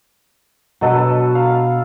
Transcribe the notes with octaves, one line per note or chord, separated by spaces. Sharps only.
B2 F#3 D4 A4 B4 D#5
F5